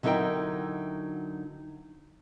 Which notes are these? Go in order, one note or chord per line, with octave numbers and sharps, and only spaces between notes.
D3 F#3 D#4 E4 A#4 G5